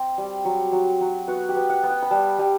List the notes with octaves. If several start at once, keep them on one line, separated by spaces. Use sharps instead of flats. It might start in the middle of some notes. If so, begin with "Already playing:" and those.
Already playing: C4
G3
F#3
F#3
F#3
B3 F#4
G4
B3
F#5
B3
G5
B5
G3 A5
G3